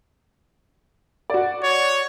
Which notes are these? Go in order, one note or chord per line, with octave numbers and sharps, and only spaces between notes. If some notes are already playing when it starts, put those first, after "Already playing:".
F#4 D5
C#5